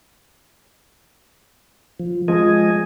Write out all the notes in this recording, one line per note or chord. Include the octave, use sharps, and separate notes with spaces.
F3
F3 G#3 D#5 G#5